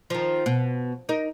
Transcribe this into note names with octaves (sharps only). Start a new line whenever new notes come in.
D#3 F3
B2
D#4 A#4